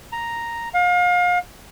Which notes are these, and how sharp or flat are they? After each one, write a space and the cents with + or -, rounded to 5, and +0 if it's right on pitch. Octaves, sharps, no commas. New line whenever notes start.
A#5 +0
F5 +35